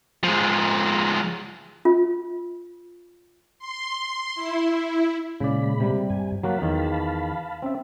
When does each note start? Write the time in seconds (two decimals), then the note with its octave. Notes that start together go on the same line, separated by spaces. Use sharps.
0.24 F3 G#3
1.85 F4
3.59 C6
4.35 E4
5.40 A#2 C#3 G#3 D5 B5
5.80 C3 G3
6.10 G2 G#5
6.43 F#3 A#3 F#4 F5 A5 B5
6.62 E2 D#3
7.62 C4 C#4 E5